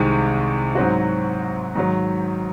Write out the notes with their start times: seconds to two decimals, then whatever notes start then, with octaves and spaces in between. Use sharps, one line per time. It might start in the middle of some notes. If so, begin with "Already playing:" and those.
Already playing: C2 C3 D#3 G#3
0.75 G#2 F#3 C4 F#4
1.75 G#2 D#3 F#3